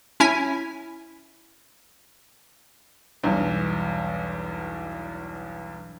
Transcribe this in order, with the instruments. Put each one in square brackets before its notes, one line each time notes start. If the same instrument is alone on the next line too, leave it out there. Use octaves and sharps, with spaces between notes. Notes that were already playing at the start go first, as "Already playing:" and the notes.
[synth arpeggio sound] C#4 E4 G#5
[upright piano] B1 E2 G2